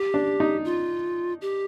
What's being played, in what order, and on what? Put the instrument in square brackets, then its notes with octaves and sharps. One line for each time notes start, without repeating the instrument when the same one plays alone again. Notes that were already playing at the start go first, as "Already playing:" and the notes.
Already playing: [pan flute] G4
[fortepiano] D4
D#4
[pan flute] F4
G4